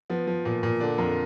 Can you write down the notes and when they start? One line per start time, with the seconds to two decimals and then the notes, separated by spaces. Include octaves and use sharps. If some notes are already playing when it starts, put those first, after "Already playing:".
0.10 F3 B3
0.27 F3
0.45 A#2
0.63 A#2
0.80 D3 D4
0.98 F2 A#4